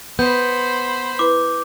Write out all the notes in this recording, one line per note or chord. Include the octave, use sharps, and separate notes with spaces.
B3 C5 B5 G6
E4 B4 D6